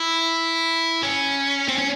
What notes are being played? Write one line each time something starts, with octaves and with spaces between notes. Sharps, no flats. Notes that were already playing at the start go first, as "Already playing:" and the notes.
Already playing: E4
C#4
C4
C#4